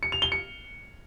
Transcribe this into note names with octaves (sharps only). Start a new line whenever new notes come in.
C#7
F7
G7
C#7